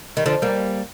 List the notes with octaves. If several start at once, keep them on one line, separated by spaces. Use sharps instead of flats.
D#3 G3
D3 F3
G3 A#3